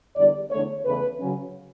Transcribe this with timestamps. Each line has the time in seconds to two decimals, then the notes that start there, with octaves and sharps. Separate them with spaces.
0.16 E2 D3 G3 D5
0.50 E2 D3 A3 C#5
0.86 E2 C#3 E3 A3 B4
1.20 C#3 F#3 C#4